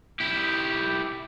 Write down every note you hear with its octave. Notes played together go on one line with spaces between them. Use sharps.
E4 G4